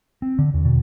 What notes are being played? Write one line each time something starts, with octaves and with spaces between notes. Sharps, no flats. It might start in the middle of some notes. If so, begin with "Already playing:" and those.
C4
D3
E2
B2